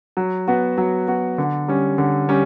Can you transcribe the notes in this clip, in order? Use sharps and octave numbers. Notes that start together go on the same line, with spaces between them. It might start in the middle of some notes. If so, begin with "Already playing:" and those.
F#3
B3 F#4
F#3
B3 F#4
D3
G3 C#4
D3
G3 C#4